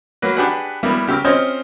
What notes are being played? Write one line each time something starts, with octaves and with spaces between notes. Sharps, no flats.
F#3 A#3 B4
D4 G4 G#4 B4 F#5
G3 A#3 B3 E4
C#3 G4 A#4 E6
C4 C#4 F4 C5 C#5 D#5